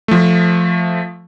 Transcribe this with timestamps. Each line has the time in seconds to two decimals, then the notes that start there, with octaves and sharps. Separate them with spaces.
0.08 F3 A3